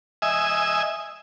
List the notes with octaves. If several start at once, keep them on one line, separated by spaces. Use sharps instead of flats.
D#5 E5 G#5